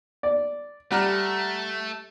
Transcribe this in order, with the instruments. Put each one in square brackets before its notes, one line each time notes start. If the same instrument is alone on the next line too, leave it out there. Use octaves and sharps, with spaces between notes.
[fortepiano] D5
[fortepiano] G3 [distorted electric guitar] A3 [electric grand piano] F#5 A#5 F6